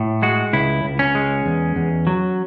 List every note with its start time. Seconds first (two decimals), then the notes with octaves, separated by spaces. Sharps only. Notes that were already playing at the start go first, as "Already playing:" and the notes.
Already playing: A2
0.22 G#3 F#4
0.53 C#2 E4
0.84 C#2
0.99 C#4
1.15 G#3
1.46 E2
1.76 E2
2.07 F#3